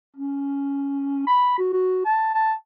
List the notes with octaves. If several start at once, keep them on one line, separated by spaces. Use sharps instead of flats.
C#4
B5
F#4
F#4
A5
A5